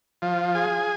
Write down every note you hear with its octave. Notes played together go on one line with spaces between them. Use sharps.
F3
G#4